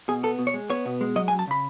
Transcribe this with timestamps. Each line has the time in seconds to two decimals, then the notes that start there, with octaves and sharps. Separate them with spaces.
0.08 B2 G#4
0.23 B3 A4
0.39 B2
0.47 C#5
0.54 G#3
0.70 B3 C#5
0.86 B2
1.01 G#3
1.16 F#3 D#5
1.28 G#5
1.32 F#2
1.39 A5
1.48 C#3 B5